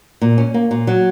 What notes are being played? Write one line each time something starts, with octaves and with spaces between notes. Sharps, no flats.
A#2
C#4
A#3
A#2
F#3